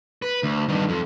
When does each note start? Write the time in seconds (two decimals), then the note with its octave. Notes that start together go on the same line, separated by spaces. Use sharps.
0.22 B4
0.43 D2
0.69 G2 D#3
0.89 F2